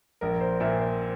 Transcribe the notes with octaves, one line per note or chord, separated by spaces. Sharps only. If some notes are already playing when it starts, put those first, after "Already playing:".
A#1 A#4
C5
A#2 E5
C5